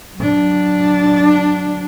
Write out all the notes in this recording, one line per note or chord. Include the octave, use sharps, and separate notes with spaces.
F#3 D4